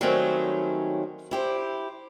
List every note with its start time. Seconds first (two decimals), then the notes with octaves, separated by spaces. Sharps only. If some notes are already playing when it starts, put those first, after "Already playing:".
0.01 D#3 F#3 G3 A3 C4 C#4
1.31 E4 G4 C5